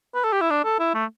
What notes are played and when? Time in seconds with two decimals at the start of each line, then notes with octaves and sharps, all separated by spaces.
0.15 B4
0.24 A4
0.33 G4
0.41 E4
0.50 D4
0.65 A4
0.80 E4
0.95 A3